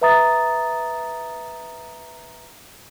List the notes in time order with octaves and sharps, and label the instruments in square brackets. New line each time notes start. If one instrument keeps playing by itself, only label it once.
[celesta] B4 E5 A#5 D#6 A6